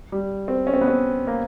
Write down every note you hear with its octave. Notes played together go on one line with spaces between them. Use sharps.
G3
C4
C#4
C4
B3
C4
A#3